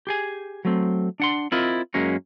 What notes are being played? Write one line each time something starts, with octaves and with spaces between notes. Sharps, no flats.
G4 G#4 G#5
F#3 A3 C4
D4 F#5 C6
C4 E4 F4 A#4 D#5
F#2 F#3 G#3 A#3 C#4